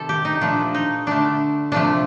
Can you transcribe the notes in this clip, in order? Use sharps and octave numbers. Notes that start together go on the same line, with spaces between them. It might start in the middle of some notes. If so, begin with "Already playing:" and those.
Already playing: C3 D#3 G3 A4
G4
D#4
A#2 F3 A3 D4
D#4
D3 A3 D4
C3 F3 A3 D4